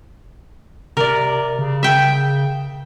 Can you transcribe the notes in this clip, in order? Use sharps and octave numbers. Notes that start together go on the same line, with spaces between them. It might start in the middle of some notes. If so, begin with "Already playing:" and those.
C3 A#4 D5
C#3
E5 G5